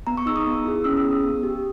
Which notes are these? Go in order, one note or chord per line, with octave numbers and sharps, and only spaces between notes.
B3 A#5
C#6
D#4 G#4 E6
D#6
B3
E4 G#4
C#4 E6
E6
G#4
D#6
B3
G4